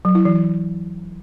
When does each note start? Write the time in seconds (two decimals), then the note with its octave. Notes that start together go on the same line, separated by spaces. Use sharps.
0.05 F#3
0.15 E4
0.25 E3